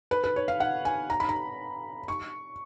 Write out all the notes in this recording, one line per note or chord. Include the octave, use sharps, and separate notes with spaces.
B4
B4
C#5
F5
F#5
G#5
A#5
B5
A#5
C#6